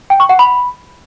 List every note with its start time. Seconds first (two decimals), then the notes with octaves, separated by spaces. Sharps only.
0.10 G5
0.20 C#6
0.29 F#5
0.39 B5